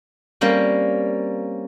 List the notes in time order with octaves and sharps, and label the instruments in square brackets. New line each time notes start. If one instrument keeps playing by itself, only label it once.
[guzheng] G3 A#3 C4 C#4